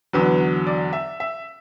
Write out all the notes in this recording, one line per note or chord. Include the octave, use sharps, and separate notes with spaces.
E2 D3 F#3 B4
D5
E5
E5